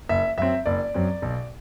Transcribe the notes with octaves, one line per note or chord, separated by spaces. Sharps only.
F#1 E5
F#2 F#3 C4 E5
F#1 D5
F#2 F#3 C4
B1